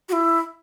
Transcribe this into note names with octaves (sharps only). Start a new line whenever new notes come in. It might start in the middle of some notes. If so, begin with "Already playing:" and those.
F#4
E4